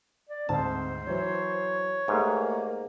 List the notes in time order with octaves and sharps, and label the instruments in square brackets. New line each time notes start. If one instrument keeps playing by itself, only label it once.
[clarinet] D5
[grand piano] D2 G#2 [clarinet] C4 [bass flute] C5 [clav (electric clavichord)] A5
[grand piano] E3 F#3 [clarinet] C#5
[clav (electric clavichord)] G#2 [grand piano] A3 G4 B4 [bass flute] A#3